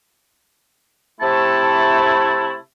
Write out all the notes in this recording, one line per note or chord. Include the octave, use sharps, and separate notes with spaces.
C3 A3 E4 A5